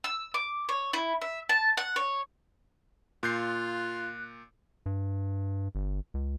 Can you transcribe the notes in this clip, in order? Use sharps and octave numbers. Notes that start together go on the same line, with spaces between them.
E6
D6
C#5
E4
E5
A5
F#5
C#5
A#2 F4 F#6 G6 C7
G2
G1
C#2